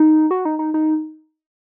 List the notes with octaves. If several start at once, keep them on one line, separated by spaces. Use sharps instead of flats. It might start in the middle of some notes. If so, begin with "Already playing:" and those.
Already playing: D#4
F#4
D#4
D#4
D#4